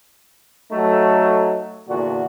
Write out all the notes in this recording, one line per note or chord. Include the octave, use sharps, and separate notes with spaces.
F#3 A3 D#4 A4
E2 A#2 D3 F#4